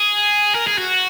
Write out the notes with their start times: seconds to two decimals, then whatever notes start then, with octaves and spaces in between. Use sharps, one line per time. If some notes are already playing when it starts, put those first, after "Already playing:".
Already playing: G#4
0.55 A#4
0.67 G#4
0.78 F#4